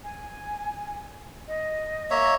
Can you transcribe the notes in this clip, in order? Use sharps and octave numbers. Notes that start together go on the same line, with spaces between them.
G#5
D#5
A#3 C#5 E5